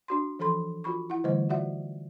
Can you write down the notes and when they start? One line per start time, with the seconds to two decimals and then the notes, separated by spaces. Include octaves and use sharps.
0.08 D4 F#4 C6
0.39 E3 F3 A4 B5 C6
0.84 F4 F#4 B5 C#6
1.10 E4 F#5
1.24 D3 E3 G3 A3 C5 D#5
1.49 F4 F#4 D5 E5 F#5